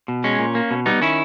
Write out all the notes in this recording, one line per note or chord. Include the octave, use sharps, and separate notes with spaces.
B2
G#3 C#4
A#2
A#3
B2
G3 B3 D#4
D#3 C#4 E4